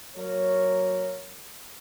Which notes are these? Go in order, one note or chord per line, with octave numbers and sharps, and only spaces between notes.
F#3 A#3 A#4 C#5